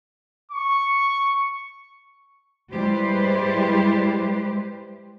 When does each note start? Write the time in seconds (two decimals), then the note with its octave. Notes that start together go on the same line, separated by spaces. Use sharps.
0.51 C#6
2.71 G3 G#3 E4 G4 B4 C5